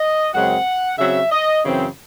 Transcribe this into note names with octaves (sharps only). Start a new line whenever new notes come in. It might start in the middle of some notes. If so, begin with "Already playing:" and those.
Already playing: D#5
F#2 C#3 G#3 C4 F#5
C#3 F#3 C4 E5
D#5
F#2 C#3 E3 C4